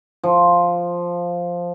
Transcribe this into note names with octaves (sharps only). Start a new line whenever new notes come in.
F3